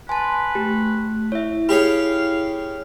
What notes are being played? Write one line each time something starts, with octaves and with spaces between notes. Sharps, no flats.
B4 G#5 A5 C6
A3 G4
E4 C#5 E5
G4 G#4 C#5 F5 B5